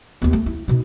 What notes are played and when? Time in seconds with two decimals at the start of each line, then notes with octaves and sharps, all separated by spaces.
0.22 D#2 B3
0.33 A3
0.46 E4
0.68 B2 D#4